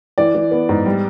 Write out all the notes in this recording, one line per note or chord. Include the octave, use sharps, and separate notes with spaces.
E3 D5
E3
B3
G#2
G3